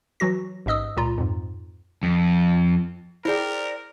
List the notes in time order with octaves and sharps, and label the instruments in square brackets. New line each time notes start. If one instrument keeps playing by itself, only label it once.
[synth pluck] E3 F#3 F#4 A#6
A1 G#2 D#5 D#6 E6
C#2 A#2 F4 A#5
F2 G#2
[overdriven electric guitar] F2
[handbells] E4 G#4 [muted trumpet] A#4 [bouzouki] C5 D5 G5